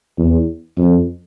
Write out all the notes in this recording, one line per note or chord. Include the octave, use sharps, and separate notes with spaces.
E2
F2